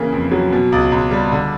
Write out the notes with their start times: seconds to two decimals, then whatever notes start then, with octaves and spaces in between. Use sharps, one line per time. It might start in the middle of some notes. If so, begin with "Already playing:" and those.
Already playing: C#3 E3 A#3
0.12 F2
0.32 F#3
0.52 B2
0.72 C#2
0.92 C#2
1.11 G3
1.32 D3